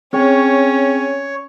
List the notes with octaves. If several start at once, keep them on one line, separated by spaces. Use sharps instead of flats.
C4 C#4 G#4 C#5 G5